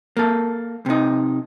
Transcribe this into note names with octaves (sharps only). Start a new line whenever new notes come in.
A#3 A4
C3 D#4